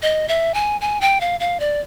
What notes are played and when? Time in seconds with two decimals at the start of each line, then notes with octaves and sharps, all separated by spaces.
0.02 D#5
0.28 E5
0.54 G#5
0.81 G#5
1.01 G5
1.21 F5
1.40 F5
1.60 D5